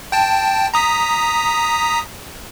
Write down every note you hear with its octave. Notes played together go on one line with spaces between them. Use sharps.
G5 A5
A#5 D#6 B6